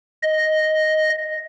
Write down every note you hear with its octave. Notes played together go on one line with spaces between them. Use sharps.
D#5